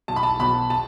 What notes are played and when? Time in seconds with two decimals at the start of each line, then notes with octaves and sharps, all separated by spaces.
0.08 B1 A5
0.16 B5
0.23 A5
0.39 B2 F#3 B5
0.70 A5